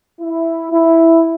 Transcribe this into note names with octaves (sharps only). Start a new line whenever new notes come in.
E4
E4